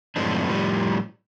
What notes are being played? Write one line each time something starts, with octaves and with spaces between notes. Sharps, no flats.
F#2 A2 F3 G#3 C4 D4
A2 F3 G3